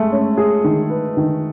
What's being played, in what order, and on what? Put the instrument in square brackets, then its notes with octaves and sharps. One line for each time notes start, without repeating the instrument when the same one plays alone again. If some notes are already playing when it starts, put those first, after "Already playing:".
Already playing: [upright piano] G#3 A3
[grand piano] C#4
G#4
D#3
B4
D#3